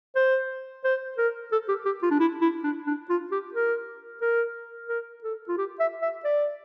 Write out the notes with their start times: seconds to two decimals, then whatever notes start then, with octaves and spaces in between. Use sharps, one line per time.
0.16 C5
0.84 C5
1.18 A#4
1.52 A4
1.69 G4
1.86 G4
2.03 F4
2.11 D4
2.19 E4
2.41 E4
2.64 D4
2.87 D4
3.10 F4
3.32 G4
3.54 A#4
4.22 A#4
4.89 A#4
5.24 A4
5.48 F4
5.58 G4
5.80 E5
6.02 E5
6.25 D5